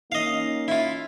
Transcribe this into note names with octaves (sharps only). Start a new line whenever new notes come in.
A#3 C#4 D#4 D#5 F5
E4 F4